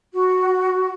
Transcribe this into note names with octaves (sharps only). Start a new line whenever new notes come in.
F#4